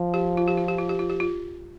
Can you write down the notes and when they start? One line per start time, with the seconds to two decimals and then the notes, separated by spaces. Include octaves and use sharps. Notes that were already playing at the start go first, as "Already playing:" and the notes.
Already playing: F3
0.14 G4
0.37 F4
0.48 G4
0.58 F4
0.68 G4
0.78 F4
0.89 G4
0.99 F4
1.10 G4
1.20 F4